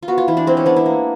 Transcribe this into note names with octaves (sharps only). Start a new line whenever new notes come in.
F4
B3 F#4
F4
E3 E4
D4
G#3 C4
C#4
B3 D4
E4
A#3